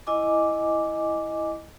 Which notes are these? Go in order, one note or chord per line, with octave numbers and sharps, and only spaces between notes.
E4 D#5 G#5 D6